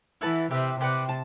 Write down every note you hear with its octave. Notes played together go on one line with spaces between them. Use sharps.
E3 E4 B4 F#5 A5
C3 G4 B4 E5
C3 G4 B4 D5 F#5
A5